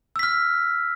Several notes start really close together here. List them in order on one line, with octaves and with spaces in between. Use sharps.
E6 B6 F6